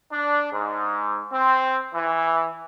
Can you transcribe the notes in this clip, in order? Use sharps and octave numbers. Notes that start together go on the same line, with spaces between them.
D4
G#2
C4
E3